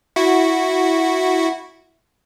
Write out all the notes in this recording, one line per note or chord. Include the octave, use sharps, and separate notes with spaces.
E4 F#4